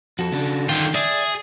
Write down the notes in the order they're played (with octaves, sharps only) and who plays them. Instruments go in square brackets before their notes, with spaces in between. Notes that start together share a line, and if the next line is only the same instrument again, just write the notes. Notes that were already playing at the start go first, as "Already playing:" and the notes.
[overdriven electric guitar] F2 [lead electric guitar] F#4 A4
[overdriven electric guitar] C#3 D4
[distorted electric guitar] D3 F4 [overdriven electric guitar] D#3 [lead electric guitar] G5
[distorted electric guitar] G#4 [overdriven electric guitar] D5 [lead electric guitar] E5